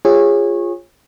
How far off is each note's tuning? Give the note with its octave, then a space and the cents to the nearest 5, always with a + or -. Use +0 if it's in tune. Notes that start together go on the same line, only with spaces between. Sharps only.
F4 +0 G#4 -25 C#5 -20